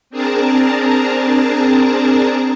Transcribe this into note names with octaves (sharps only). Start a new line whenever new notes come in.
C4 D4 G#4 A#4 A5 A#5